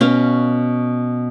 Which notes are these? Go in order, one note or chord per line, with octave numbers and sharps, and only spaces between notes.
B2 C#4 F5